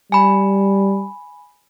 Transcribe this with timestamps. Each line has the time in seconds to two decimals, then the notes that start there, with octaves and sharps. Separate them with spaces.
0.12 G3 G#5 B5